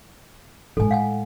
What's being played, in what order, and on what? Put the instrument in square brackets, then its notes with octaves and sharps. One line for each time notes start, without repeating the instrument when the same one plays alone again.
[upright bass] A2 G#3 [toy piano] A4 G#5
[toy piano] F5 F#5 G#5